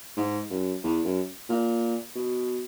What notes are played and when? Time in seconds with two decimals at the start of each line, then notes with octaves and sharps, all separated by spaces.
0.17 G#2
0.50 F#2
0.83 E2
1.04 F#2
1.49 A#2
2.15 B2